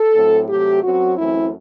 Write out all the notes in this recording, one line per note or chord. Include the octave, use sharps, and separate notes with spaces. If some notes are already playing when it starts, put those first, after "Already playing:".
Already playing: A4
A2 F#3 C4
C3 F#3 A3 G4
F#2 F#3 C4 F#4
F#2 E3 A3 C4 E4